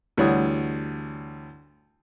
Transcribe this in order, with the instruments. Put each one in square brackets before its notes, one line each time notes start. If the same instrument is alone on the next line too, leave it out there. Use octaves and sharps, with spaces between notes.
[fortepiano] D2 E3 G3 C#5 F#5 D#6